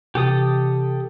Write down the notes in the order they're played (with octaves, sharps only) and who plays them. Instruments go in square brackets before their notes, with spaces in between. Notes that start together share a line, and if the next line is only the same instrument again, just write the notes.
[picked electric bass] C3 E3 [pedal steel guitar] G4 A4 D#6